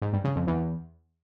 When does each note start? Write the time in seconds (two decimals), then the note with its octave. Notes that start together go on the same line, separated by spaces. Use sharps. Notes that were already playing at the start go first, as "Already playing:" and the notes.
0.02 G#2
0.13 G2
0.24 C#3
0.36 F2
0.47 E2